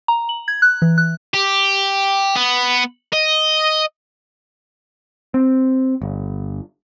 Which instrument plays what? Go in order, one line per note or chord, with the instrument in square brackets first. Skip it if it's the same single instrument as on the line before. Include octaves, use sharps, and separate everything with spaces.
[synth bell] A#5
F#7
G#6
F#6
E3
F#6
[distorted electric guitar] G4
B3
D#5
[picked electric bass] C4
G1